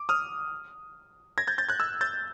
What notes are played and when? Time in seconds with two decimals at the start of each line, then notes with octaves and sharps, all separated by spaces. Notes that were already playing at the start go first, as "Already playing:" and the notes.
Already playing: D6
0.09 D#6 F6
1.38 G#6 A#6
1.47 G6 A6
1.58 G6 A6
1.69 F#6 G#6
1.80 E6 F#6
2.01 G6 A6